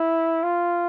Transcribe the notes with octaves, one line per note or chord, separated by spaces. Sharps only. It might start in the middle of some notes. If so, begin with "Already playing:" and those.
Already playing: E4
F4